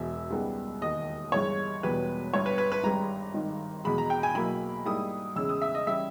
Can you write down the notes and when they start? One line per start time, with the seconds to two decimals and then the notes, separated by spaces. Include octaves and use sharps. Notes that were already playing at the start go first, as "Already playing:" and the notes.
Already playing: E1 E2 B2 E5
0.31 C#2 C#3 G3 B3 D#4
0.81 E1 D#2 D#3 D#5
1.32 G1 G2 E3 G#3 C#5
1.83 E1 E2 B2 G3 B4
2.34 G1 G2 G3 C#5
2.46 B4
2.58 B4
2.72 B4
2.84 G#1 G2 G3 A#5
3.34 G#1 G2 D#3
3.84 E2 B2 G#3 B5
3.98 A#5
4.10 G5
4.23 G#5
4.35 B1 B2 A#3 E4 B5
4.85 G#2 G3 A#3 E4 D#6
5.36 E2 C#3 G#3 C#4 E4 E6
5.49 D#6
5.62 E5
5.75 D#5
5.86 E3 G3 C#4 E4 E5